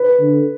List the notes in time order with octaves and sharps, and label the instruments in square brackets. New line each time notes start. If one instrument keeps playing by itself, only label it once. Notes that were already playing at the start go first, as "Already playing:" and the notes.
Already playing: [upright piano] B4
[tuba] D3